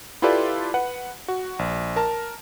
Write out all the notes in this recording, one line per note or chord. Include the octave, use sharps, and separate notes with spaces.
E4 F4 G4 A4 B4 D5
B4 F#5
F#4
A#1
A#4 A5